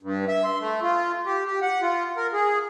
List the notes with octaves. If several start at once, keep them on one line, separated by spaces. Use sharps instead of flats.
G2
E5
C6
A3
F4
G4
G4
F#5
F4
A#4
G#4